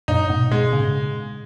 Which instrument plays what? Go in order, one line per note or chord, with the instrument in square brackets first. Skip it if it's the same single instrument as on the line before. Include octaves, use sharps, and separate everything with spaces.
[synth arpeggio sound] F#2 A#2 [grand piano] D#4
[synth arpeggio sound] G#2 B2
[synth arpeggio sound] G#2 B2 [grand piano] G#3
[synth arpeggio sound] A#2 C#3